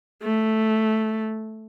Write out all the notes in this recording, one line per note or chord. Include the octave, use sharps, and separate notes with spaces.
A3